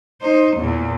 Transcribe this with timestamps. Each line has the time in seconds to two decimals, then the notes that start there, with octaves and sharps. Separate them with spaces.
0.21 D#4 C5
0.57 E2 A#2